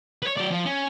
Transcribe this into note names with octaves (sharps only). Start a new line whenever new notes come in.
B4 C#5
F#3 D5
F3
C#4